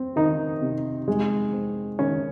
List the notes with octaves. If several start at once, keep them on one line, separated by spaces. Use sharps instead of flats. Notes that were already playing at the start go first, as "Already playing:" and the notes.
Already playing: C4
D#3 D#4
C3
G#3
C4
D#3 C#4